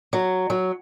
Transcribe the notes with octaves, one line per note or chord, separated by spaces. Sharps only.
F#3
F#3